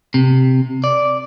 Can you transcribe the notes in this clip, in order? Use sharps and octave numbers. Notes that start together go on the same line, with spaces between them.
C3
D5